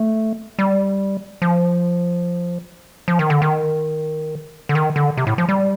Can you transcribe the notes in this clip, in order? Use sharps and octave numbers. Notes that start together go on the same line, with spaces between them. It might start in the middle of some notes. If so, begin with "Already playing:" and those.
Already playing: A3
G3
F3
F3
D#3
D3
D#3
D3
D#3
D3
C3
A2
F3
G3